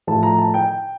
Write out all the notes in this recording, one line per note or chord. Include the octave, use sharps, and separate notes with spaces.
A2 F3 A5
A#5
A5
G5